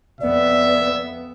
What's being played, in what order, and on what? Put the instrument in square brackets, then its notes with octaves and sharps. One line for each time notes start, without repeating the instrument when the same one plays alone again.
[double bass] F2 B3 [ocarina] D5 [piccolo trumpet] E5